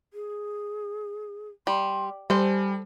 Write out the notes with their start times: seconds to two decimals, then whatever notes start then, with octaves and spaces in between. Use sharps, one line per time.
0.13 G#4
1.67 G3 C6
2.30 G3 A4 C5 G#5